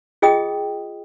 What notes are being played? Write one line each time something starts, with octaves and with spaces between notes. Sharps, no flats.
F4 G#4 D#5 G5 D#6